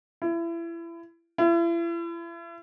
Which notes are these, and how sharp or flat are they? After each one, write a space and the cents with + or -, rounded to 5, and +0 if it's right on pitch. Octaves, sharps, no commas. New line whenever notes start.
E4 +30
E4 +40